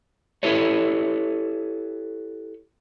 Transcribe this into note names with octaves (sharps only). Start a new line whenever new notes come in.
E4 G4 A4 B4 C#5